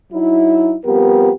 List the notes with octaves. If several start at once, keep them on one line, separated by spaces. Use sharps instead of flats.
F#3 D#4 E4
F2 G3 B3 G4 A#4